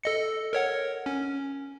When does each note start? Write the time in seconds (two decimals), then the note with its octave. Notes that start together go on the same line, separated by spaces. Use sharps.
0.04 A4 D#5 C#7
0.53 A#4 C#5 F#5
1.06 C#4